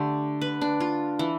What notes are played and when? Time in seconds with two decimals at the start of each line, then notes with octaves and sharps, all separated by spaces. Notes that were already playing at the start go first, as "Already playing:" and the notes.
Already playing: D3 A3 G4
0.41 B4
0.61 D4
0.80 F4
1.19 E3